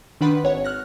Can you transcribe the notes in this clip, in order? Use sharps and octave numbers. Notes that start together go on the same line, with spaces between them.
D#3 D4 B4 F#5 B5 C6
G#1 C#5 F#5
F6 F#6 A#6